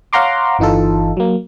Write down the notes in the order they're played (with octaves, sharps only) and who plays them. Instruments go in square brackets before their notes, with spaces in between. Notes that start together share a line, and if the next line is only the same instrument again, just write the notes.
[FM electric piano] C#5 F5 F#5 A#5 C6 D6
G1 E3 D#4 F4 A4
F#3 A#3